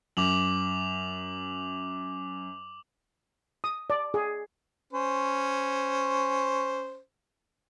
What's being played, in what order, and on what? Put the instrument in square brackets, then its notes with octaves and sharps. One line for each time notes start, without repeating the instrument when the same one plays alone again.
[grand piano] F#2 [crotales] D6 F7 F#7
[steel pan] D#6
D5
G#4
[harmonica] C#4 C5